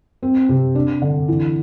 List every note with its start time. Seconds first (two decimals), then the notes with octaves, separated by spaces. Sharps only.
0.23 C4
0.49 C3
0.75 D4
1.02 D3
1.28 E3